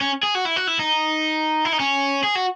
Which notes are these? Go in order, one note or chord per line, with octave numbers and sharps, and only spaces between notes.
C#4
G#4
F#4
E4
F#4
E4
D#4
E4
D#4
C#4
G#4
F#4